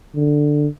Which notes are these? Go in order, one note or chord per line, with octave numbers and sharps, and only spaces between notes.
D3